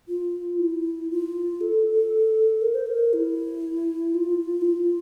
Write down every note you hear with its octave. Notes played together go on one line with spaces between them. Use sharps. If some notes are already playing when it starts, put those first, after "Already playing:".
F4
E4
F4
A4
A#4
C5
A#4
E4
F4
E4
F4